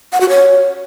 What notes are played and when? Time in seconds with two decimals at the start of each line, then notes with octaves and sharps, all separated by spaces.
0.12 F#5
0.21 F#4
0.29 C#5